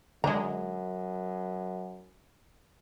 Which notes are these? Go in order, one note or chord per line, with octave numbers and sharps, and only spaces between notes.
F#2 D3 G#3 A#5